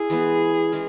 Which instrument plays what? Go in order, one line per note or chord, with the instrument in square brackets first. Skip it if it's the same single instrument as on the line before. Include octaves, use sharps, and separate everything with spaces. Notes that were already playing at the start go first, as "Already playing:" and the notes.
Already playing: [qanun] E4 [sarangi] G#4
[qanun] E3 G#3 B3
E3 G#3 C#4